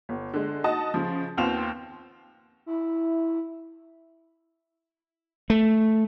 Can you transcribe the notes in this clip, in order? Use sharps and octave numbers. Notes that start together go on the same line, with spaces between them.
G1
D3 G#3
D#4 F#4 D#5 A5 D#6
C#3 F3
D#2 B3 C4 F4 E7 F7
E4
A3